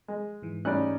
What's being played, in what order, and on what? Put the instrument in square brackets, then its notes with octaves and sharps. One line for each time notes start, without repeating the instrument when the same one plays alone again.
[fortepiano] G#3
[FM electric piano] G#2 E3
[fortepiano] A2 G3 F#6 [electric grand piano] C#4 [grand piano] D#4 D5